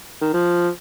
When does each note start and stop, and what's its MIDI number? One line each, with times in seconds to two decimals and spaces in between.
0.21 0.33 51
0.34 0.69 53